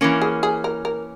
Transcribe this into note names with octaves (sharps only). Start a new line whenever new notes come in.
E3 A#3 C#4
G#4
G#4
A#4
A#4